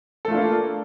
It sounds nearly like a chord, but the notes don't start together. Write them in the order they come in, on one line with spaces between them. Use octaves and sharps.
A4 A3 F4 D4 A#3